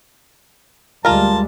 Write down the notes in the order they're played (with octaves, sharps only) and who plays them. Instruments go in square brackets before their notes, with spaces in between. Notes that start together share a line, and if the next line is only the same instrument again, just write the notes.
[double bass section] D2 G3 G#3 [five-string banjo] F4 A#4 [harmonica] A5